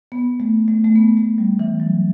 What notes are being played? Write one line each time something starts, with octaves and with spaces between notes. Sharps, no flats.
B3
A3
A3
A3
B3
A3
G3
E3
F#3